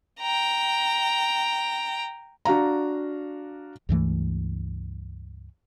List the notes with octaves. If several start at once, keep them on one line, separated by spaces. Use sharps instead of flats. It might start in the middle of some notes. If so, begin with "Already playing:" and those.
G5 A#5
D4 F#4 F5 A#5
C#2 G2 E3 A3